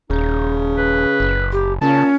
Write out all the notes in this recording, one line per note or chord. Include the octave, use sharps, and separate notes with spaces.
D#1 C#3 D#4
B4
F#1
G4
A#2 C#3 C#4 A5